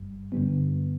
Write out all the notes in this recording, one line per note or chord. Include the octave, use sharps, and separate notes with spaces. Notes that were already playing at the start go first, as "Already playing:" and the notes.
Already playing: G1 G2 G3
G2 D3 G3 B3